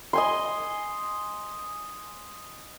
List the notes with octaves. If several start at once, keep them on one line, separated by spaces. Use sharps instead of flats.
D#5 G#5 C6